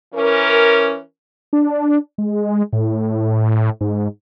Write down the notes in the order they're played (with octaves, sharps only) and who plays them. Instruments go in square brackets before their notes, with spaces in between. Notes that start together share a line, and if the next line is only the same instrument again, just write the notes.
[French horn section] E3 C#4 A#4
[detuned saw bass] D4
G#3
A2
G#2